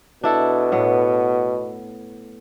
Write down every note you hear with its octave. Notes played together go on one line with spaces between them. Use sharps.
B2 D4 E4 A4
A2 B3